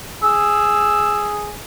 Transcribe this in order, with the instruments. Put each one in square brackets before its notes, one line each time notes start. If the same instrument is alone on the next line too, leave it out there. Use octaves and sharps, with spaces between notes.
[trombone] G#4 [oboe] E6